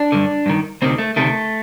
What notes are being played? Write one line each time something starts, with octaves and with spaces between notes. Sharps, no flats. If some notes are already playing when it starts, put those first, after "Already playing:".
Already playing: D4
G2 D3
G2 D#3
D2 C3 D#3 C4
A3
D2 C3 D#3 A3